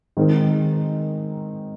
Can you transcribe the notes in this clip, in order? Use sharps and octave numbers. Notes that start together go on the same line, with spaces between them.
D#3 G#3 C4 D#4 A#4